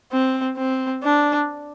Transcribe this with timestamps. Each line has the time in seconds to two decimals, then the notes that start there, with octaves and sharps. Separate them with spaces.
0.12 C4
0.57 C4
1.03 D4